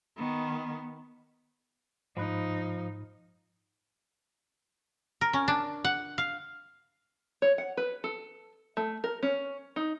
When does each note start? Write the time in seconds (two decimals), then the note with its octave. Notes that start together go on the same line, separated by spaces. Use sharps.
0.17 D#3 B3
2.17 G#2 F3 D#4 B5 F#6
5.21 A#4
5.33 C#4
5.48 D4
5.84 F#5
6.18 F5
7.42 C#5
7.58 F#5
7.77 B4
8.04 A4
8.77 A3
9.04 A#4
9.23 C#4
9.76 D#4